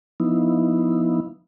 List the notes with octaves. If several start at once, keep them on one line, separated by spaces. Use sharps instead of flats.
F3 B3 D#4 E4